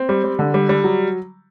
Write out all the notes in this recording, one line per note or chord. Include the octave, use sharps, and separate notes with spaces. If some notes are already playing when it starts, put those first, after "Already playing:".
Already playing: C4
G3
G3
D3
G3
G3
F#3